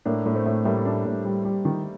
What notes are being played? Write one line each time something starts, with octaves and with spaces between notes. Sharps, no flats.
A2 A#3 D4
A2
A3 C4
A2
A2 G3 A#3
D4
A2
G3
G3
D#3